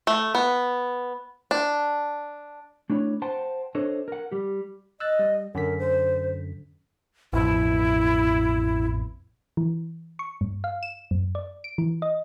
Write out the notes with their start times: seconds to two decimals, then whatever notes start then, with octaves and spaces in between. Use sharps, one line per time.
0.07 A3
0.35 B3
1.51 D4
2.90 A3 D4 E4 C#5
3.22 C5 F#5 G5 A5 C6
3.75 D4 A4 C5 C#5 D#5
4.08 A#4 F#5
4.32 G3 G4
5.00 D#5 E6 F#6 A6
5.19 G3
5.55 F#2 D3 A#4 B6
5.79 C5
7.33 A1 F2 B2 E4
9.57 E3
10.19 C#6
10.41 G2
10.64 F5
10.83 E7
11.11 F#2
11.35 D5
11.64 D7
11.78 E3
12.02 D#5